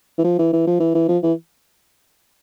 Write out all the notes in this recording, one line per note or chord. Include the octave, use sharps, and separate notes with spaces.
E3
F3
E3
E3
F3
E3
E3
F3
E3